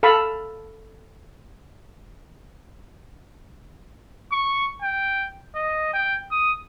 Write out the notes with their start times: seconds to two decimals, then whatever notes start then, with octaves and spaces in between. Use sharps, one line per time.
0.03 A4 F5 A5 B5
4.32 C#6
4.82 G5
5.55 D#5
5.94 G5
6.31 D#6